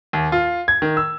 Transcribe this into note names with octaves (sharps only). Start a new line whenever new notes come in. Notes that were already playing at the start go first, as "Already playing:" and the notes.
D#2
F4
G#6
D#3
E6